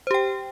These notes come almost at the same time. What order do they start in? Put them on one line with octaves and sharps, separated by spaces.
C5 G4 G5